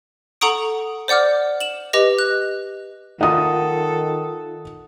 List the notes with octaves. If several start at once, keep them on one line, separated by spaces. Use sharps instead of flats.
A4 F#5 A#5 C#6 D#6 D7
C5 D5 F#5 D6 F6
E7 F#7
G4 B4 D#5 A#6
F#6
D#3 D#4 F4 A4 F#5 A#5 D#6